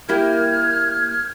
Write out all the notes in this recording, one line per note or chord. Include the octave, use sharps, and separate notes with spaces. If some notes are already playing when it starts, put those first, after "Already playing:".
A#3 E4 G4 F6 G6 G#6